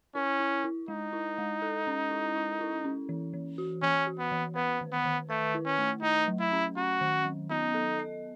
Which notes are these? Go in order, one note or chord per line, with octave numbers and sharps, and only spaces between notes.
C#4 E4
E4
E4
G#3 D#4
E4
G#3
A4
C#4
E4
E4
E4
C#4
E3
E3
F#4
E3 C#4
F#4
B3
E3
B3 B4
D#3
B3
D#3
A3 B4
E4
C#4
A3
A3 D#4
F#3
E4
C#4
C#4 F#4
D#3
F#3
B3 D#4
A4
D#5